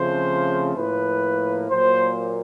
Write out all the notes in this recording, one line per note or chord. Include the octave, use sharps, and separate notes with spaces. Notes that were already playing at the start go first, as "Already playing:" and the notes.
Already playing: C#3 F3 A3 C4 C5
A2 F3 A#3 B4
A#2 F#3 A#3 C5